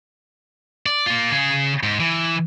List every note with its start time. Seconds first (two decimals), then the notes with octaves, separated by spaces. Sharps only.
0.86 D5
1.06 A#3 F4
1.32 C#3 G#4
1.83 G#2
2.00 E3